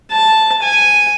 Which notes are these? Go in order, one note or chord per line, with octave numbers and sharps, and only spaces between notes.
A5
G#5